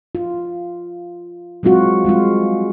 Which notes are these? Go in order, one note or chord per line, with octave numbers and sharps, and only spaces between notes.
F4
F#3 G#3 C4 F4 F#4
G3 G#3 C4 F4